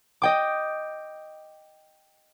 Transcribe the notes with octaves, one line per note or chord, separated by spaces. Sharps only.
D#5 G5 D6